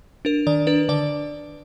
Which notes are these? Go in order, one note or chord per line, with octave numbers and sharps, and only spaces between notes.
D4 A#4
D#3 D5
D4 B4
D3 D5